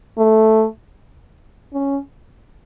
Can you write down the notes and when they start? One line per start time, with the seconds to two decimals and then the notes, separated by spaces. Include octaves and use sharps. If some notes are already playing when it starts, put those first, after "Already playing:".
0.18 A3
1.73 C#4